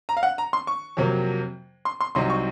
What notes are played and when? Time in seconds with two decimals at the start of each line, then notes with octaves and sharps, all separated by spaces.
0.09 A#5
0.17 F5
0.23 F#5
0.38 A#5
0.53 C6
0.67 C#6
0.97 F2 C3 F#3 A#3
1.85 C6
2.01 C6
2.15 C2 C3 F#3 C4 D#4 C6
2.30 C#6